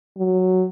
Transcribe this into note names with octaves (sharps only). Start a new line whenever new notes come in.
F#3